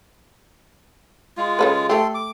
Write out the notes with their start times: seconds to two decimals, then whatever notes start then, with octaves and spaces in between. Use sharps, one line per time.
1.37 G#3 F4
1.59 C#3 A4 B4
1.89 A3 G4 A4 C6
2.14 D6